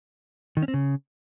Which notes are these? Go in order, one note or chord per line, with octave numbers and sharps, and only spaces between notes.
D#3
C#4
C4
C#3